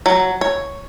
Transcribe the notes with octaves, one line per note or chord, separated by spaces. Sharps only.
F#3
C#5